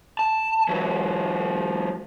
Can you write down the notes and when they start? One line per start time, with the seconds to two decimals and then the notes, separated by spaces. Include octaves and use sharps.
0.19 A5
0.69 E3 F#3